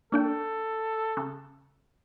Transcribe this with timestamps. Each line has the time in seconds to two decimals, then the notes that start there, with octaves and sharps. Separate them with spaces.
0.12 A#3 D4 A4 G5
1.17 C#3